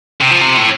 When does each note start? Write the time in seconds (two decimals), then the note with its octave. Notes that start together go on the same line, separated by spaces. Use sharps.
0.21 C3
0.31 F3
0.41 C3
0.57 A2